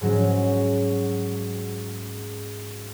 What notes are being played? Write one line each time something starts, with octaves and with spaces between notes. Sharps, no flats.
G#2 F#3 G#3 C#4